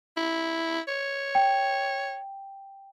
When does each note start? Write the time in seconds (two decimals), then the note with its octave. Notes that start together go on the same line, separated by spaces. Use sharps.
0.17 E4
0.88 C#5
1.35 G5